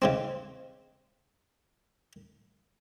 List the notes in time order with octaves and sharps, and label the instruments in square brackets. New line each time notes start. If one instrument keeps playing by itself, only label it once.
[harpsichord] C#3 G#3 C4